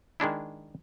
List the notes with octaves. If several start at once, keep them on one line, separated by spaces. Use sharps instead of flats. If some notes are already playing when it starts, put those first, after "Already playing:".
D#3 G#3 D4 E4